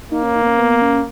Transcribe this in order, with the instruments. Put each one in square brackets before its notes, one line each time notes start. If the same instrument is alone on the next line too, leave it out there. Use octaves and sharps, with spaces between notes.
[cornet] A#3 [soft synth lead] D#4
[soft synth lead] C#4
D#4
B3
C#4
B3
C#4